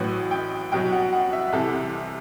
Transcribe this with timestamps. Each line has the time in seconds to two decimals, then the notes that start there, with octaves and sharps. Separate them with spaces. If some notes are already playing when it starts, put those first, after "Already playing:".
Already playing: A1 A2 F#3 B4
0.31 G5
0.72 C2 B2 F#3 G5
0.92 F#5
1.13 F#5
1.33 E5
1.52 C2 C3 E3 A4